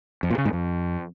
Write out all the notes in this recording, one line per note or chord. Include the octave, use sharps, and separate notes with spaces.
F2
A#2
C#3
G#2
F2